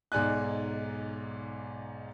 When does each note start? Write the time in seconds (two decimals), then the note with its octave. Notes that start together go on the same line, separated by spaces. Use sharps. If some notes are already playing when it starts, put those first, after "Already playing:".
0.12 B1 G#2 D5 G#5 F#6